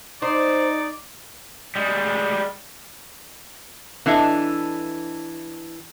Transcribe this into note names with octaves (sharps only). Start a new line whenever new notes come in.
D#4 C5 D5
G3 G#3
E3 D4 A4 D#5 E5